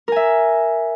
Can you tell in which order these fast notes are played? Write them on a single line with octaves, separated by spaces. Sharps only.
A#4 G#5 E5